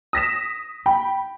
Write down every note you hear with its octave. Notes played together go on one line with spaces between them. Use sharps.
D#6 A#6 B6 E7
G5 B5